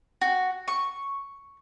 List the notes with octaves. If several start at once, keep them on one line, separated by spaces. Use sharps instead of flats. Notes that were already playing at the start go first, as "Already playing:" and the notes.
F#4
C#6